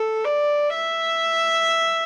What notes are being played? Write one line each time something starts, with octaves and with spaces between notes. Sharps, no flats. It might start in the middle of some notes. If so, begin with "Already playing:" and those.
Already playing: A4
D5
E5